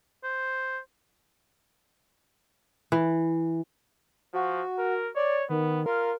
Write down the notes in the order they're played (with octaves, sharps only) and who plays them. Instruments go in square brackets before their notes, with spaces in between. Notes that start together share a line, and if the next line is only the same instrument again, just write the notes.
[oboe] C5
[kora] E3
[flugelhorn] F3 [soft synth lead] F#4
[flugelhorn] A#4
[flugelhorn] C#5 [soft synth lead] D5
[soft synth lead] D#3 [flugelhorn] B3
[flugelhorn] F4 [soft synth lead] A#4